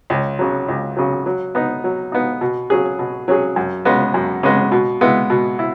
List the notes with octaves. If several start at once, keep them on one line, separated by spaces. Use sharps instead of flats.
C#2
C#3 F#3
C#2
C#3 F#3
F#3
B3 D#4
F#3
B3 D#4
B2
F#3 C#4 G#4
B2
F#3 C#4 G#4
F#2
C#3 G#3 B3
F#2
C#3 G#3 B3
B2
G#3 B3 E4
B2
E4